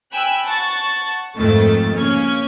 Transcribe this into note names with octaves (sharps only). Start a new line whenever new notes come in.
G5 G#5 B5 E6 F#6
F#5 A5 C#6 A6
F2 G#2 D#3 A3 A6
C#3 A#3 C#4 G#6